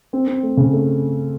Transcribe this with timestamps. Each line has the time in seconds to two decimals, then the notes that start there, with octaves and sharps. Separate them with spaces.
0.13 C4
0.27 C4
0.43 A3
0.57 C#3
0.73 A3